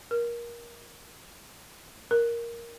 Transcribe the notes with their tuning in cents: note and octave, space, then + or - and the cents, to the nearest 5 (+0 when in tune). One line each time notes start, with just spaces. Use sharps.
A#4 +25
A#4 +5